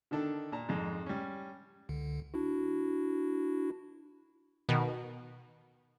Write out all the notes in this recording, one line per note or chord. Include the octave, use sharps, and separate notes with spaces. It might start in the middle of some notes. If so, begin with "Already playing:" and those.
D3 D#3 D4 A4
A#2 A5 A#5
F2 G#2
G3 C#4
C#2 D3
D4 E4 F#4
B2 D#3